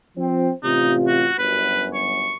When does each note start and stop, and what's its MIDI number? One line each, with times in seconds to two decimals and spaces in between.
0.17 0.49 53
0.17 0.49 60
0.63 1.28 33
0.63 1.28 48
0.63 0.93 63
0.63 1.28 65
1.07 1.35 66
1.39 2.35 31
1.39 2.35 42
1.39 1.85 71
1.94 2.36 85